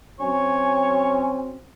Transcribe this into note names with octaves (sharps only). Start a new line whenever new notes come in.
F#3 C4 C#4 C#5 G#5